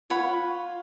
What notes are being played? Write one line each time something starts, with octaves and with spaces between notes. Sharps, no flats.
F4 C#5 F#5 B5